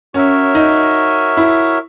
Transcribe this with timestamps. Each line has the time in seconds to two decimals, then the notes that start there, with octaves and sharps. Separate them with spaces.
0.14 C#4 F#4 A#4 C#5 E5
0.55 D#4
1.37 E4